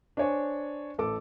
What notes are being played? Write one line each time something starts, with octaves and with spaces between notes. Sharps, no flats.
D4 C5 C#5 G#5
A1 A4 D6